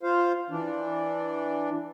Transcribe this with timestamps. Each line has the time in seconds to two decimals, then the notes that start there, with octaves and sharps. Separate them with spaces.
0.03 F4 C5 F5
0.50 E3 D4